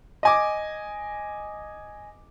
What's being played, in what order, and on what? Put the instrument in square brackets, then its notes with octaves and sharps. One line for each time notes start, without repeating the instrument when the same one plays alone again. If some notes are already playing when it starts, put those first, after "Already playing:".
[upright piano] D#5 G#5 D6